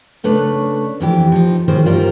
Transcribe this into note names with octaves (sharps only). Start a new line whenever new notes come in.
C#3 A3 D4 B4 C#5
F2 E3 G4
F3 D#4
D#3 E3 C#4 G#4 C5
D2 G2 G3 F4 A#4 C5